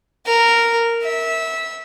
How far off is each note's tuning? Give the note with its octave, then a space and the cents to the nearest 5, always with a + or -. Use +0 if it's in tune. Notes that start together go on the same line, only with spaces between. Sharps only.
A#4 -5
E5 -20